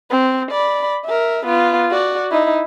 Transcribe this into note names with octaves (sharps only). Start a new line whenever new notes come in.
C4
D5 B5
A#4 E5
B3 F4
F#4 D5
D#4 E4